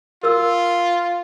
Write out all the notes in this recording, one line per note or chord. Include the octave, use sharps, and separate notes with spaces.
F4 A#4 E6